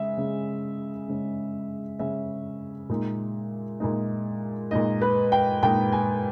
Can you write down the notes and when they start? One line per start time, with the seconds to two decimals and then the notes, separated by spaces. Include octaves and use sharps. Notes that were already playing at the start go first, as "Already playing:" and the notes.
Already playing: C#3 G#3 C#4 E5
0.18 C#3 G#3 C#4
1.08 C#3 G#3 C#4
1.99 C#3 G#3 C#4 E5
2.89 A#2 G#3 D#4
3.80 A#2 G#3 D#4
4.71 A#2 G#3 D#4 D#5
5.02 B4
5.32 G5
5.63 A#2 G#3 D#4 G5
5.92 G#5